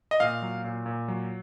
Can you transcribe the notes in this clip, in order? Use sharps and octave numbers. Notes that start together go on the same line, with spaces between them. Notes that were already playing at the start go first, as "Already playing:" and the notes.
D#5
A#2 F5
F#3
A#2
A#2
F#3